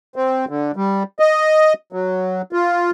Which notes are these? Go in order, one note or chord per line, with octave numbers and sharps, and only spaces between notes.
C4
D3
G3
D#5
F#3
F4